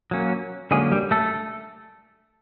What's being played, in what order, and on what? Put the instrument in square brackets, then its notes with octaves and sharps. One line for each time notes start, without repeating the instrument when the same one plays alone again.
[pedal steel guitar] F#3 A#3 C#4
D3 F#3 G#3 A#3 C#4 G#4
G3 G4
A3 A4